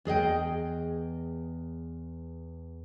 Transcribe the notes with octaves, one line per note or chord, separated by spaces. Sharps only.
E2 G#4 D#5 G5